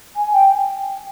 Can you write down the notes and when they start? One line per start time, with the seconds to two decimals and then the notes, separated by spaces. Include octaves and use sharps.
0.16 G#5
0.33 G5